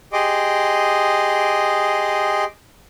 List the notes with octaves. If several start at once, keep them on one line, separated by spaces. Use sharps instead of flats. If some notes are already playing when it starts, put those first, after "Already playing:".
G4 G#4 D#5 C6 D6